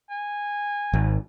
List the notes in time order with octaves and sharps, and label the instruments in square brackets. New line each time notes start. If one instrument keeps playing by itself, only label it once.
[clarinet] G#5
[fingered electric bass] G#1